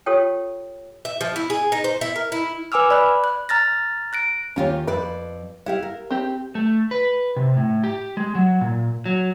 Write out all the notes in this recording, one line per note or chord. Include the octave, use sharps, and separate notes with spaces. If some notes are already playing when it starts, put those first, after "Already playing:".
F4 G4 A4 C#5 G5
E5
F3
E4
G#4
D#4
C5
E4
A#4
E4
B4 G#5 D6 E6 F6
D5 B5 F#6
F#6
A#5 F6 A6 A#6
F#6 A#6 D7
D#2 C#4 F4 G4 C#5
F2 B4 D5
E4 G4 F5 F#5
A#4
C4 G4
A3
B4
C3
A2
G4
G#3
F#3
A#2
F#3